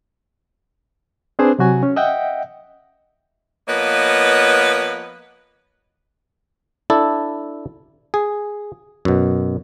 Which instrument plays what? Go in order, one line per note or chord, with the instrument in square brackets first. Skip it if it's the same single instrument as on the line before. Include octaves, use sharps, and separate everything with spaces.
[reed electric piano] C4 D4 G#4 B4 C5
C3 F#3 F#4 G#5
C#4
D#5 E5 F#5 G5
[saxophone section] F3 A#3 B3 B4 C#5 D#5
[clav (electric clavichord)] D4 E4 A4
G#4
F#2 B2